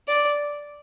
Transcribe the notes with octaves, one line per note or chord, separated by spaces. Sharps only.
D5